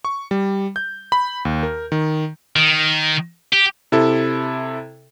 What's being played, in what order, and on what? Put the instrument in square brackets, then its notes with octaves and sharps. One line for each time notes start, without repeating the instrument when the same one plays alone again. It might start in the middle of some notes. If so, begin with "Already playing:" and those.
[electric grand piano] C#6
G3
G6
B5
D#2
A#4
D#3
[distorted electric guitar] D#3
G4
[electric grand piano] C3 E4 A4